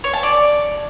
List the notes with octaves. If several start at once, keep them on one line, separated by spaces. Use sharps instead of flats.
C#5
A5
D5